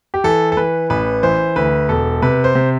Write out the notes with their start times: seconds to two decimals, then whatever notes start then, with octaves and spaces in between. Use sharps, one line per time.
0.14 G4
0.24 E3 A4
0.52 A4
0.57 E3 B4
0.90 A1 B4
1.23 E3 C5
1.56 D2 B4
1.89 E1 A4
2.22 C3 B4
2.44 C5
2.55 C3